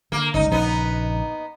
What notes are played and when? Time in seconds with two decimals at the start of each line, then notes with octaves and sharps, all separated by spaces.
0.12 D3 A#3
0.34 G1 C#2 D#4
0.52 A#1 C#3 B3 D#4